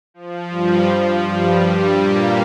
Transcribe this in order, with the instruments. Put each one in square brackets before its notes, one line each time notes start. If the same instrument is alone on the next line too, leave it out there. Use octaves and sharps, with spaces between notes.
[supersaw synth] F3
G2 G3
F3
G2 G3
A#2 A#3